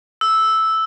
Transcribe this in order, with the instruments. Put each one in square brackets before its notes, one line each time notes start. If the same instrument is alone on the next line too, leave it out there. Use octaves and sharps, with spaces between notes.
[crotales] E6